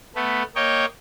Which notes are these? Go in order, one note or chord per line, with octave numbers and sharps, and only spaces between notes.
A3 B3
A#3 C#5 D#5 G5